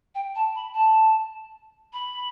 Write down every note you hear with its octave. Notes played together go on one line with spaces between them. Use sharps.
G5
A5
B5
A5
B5